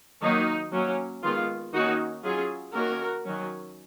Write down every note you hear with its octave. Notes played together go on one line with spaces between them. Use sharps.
D#3 F#3 A#3 D#4
F#3 A#3 C#4
D#3 G#3 B3 F4
D#3 A#3 C#4 D#4 F#4
F#3 C#4 F4 G#4
D#3 A#3 C#4 F#4 A#4
D#3 F#3 C#4